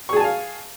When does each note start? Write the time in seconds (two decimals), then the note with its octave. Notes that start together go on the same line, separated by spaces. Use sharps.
0.09 C#6
0.13 G#4
0.17 A5
0.20 G#5
0.24 F5